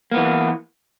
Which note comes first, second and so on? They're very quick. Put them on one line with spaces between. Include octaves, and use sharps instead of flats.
A#3 B3 E3